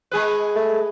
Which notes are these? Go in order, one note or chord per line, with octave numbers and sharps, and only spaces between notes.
G#3 G#4 B4
A3